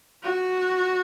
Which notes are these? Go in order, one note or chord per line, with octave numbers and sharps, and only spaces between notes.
F#4